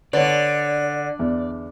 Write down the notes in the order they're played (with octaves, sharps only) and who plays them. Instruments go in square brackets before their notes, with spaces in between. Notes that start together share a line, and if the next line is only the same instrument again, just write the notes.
[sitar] D3 [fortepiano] B4 C#5 [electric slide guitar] D5
[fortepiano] E2